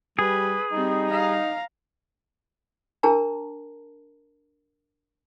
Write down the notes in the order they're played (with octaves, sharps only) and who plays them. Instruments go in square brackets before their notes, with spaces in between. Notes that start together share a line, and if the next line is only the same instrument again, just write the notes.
[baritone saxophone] G3 [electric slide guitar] G#4 [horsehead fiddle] B4
[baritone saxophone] G3 [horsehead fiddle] C4 [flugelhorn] D#4
[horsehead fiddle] F5 A#5
[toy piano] D4 G#4 A#4 A5 A#5